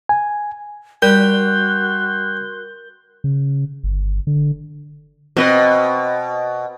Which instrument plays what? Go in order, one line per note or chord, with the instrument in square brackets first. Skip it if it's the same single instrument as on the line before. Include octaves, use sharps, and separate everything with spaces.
[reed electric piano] G#5
[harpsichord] G3 [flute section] F#4 C6 F#6 [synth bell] A#4 G6 G7
[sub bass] C#3
G1
D3
[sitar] B2 [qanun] C4 B4 D#5